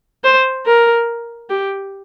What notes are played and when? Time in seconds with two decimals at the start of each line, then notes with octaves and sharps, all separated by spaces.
0.24 C5
0.66 A#4
1.49 G4